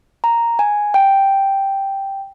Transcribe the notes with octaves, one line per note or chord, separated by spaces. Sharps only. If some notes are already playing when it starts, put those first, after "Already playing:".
A#5
G#5
G5